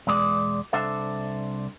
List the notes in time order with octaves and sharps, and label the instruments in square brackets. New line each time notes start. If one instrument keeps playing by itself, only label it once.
[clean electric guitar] E2 B2 G#3 D5
C2 D4 A4 C5 E5